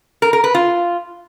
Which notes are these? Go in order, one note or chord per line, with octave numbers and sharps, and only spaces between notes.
A#4
A#4
B4
F4